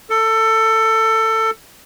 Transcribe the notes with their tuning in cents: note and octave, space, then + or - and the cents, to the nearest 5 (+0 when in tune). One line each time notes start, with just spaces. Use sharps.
A4 +20